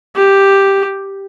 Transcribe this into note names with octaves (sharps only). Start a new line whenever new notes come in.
G4